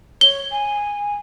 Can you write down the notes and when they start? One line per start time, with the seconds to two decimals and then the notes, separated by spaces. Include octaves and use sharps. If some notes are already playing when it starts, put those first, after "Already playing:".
0.21 C#5 G7
0.51 G#5